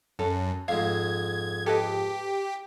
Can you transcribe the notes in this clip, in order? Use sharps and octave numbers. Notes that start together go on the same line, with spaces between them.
F#2 A4
F2 G#2 F5 G#6
G4 A4 B4 D#5